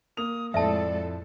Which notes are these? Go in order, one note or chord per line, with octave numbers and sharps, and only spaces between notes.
A#3 D#6 F7
F2 A2 G#3 E4 A4 D5 E5 A5